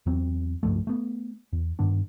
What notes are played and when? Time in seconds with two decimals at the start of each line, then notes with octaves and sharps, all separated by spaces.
0.06 E2 F#3 C4
0.63 C#2 G2 F3 A3
0.87 A3 B3
1.53 E2
1.79 G2 D#3 B3 D4